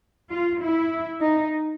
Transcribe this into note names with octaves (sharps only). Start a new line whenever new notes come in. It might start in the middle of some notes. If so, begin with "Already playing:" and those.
F4
E4
D#4